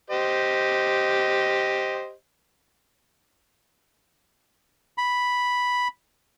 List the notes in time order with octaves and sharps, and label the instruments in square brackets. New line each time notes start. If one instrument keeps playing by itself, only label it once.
[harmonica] G4 C5 D#5
[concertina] B5